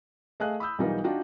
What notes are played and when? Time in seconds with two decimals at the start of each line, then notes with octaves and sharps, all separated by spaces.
0.40 A3 G#4 D#5 F5 F#6
0.60 B5 D#6 E6 G6
0.78 B1 E3 G3 D#4 F4 A#4
1.04 D4 D#4 F4 F#4 G5